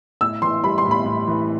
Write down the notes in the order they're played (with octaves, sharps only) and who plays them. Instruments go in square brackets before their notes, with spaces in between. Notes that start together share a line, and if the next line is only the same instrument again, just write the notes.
[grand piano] A2 [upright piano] E6
[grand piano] E3 [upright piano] C6
[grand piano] G3 [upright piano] B5
[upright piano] C6
[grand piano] A2
[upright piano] B5
[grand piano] A2
E3